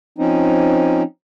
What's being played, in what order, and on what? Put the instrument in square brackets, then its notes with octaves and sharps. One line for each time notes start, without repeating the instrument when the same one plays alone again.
[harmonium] F3 C4 C#4 D#4